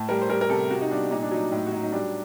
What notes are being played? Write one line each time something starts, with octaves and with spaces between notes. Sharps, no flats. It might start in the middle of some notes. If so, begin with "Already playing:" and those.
Already playing: A2 A5
G3 A#4
C5
G3 A#4
A#4
C3 A4
C3 F#4
D#4
G3 D4
A#2 D#4
D4
F#3 D#4
A2 D#4
F#4
F#3 D#4
D#4
G3 D4